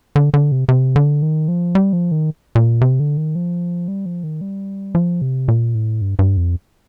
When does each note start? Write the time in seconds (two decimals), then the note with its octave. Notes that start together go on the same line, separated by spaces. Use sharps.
0.16 D3
0.34 D3
0.52 C3
0.69 C3
0.96 D3
1.22 D#3
1.48 F3
1.75 G3
1.93 F3
2.11 D#3
2.55 A#2
2.81 C3
3.00 D3
3.17 D#3
3.35 F3
3.88 G3
4.06 F3
4.24 D#3
4.41 G3
4.95 F3
5.22 C3
5.48 A#2
5.75 A2
6.01 G2
6.19 G2
6.37 F2